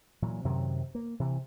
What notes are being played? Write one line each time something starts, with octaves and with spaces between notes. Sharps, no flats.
A#2 E3 F#3
F#2 C3 D#3 F#3
A#3
C3 E3